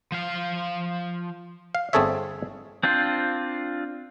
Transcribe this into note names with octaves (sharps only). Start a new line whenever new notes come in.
F3 F5
F5
G1 C4 G#4 A4 C#5 E5
C4 D4 F4 C5